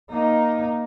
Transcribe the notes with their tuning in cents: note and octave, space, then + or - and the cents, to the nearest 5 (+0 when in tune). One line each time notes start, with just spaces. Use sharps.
A#3 +10 D#4 +0